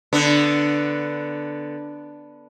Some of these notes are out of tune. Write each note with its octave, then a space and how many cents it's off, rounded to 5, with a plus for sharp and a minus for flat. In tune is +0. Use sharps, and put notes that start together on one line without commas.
D3 +0 B3 +0 D4 +0